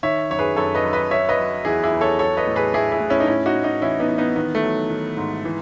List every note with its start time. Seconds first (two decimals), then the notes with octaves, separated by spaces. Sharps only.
0.03 D#3 C#5 E5
0.30 F#2 C#5
0.39 G#4 B4
0.56 F#2 A4 C#5
0.75 B4 D#5
0.84 F#2
0.93 B4 D#5
1.11 F#3 C#5 E5
1.29 B4 D#5
1.39 F#3
1.65 E2 E4 G#4
1.84 E4 G#4
1.92 E2
2.01 A4 C#5
2.19 F#3 A4 C#5
2.37 B4 D#5
2.47 A2
2.56 G#4 B4
2.73 A2 E4 G#4
2.92 E4 G#4
3.00 A2
3.10 C#4 E4
3.20 D#4
3.27 A2 C#4 E4
3.46 D#4 F#4
3.55 A2
3.64 D#4 F#4
3.82 E3 C#4 E4
4.00 B3 D#4
4.08 E3
4.18 B3 D#4
4.36 D#3 B3
4.55 A3
4.63 F#3
4.90 D#3
5.17 G#2
5.45 E3